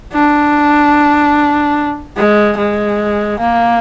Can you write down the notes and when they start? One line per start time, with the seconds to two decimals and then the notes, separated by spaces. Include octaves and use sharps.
0.13 D4
2.17 G#3
2.58 G#3
3.40 A#3